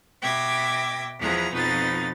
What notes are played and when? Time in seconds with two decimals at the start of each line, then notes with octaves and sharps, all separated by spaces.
0.21 B2 E5 G5 D6 G#6 A#6
1.18 E2 F3 B3 G#4 A#5
1.52 F2 B2 F3 D#4 B4 A6